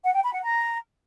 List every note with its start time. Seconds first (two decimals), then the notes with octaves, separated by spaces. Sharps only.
0.04 F#5
0.14 G5
0.23 B5
0.33 F#5
0.43 A#5